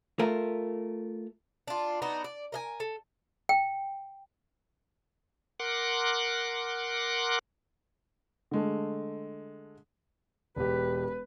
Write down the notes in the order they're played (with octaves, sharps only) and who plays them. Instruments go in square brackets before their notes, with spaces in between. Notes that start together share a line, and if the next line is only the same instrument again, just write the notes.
[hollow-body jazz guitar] A3 F4 A#4
[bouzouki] D4 F4
B3 D4 D#4 F#4
D5
A#4 D#5 G#5
A4
[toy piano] G5
[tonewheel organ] A#4 F#5 C6 D6 F#6
[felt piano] D3 G#3 A3
[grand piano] E1 G4 [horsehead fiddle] B4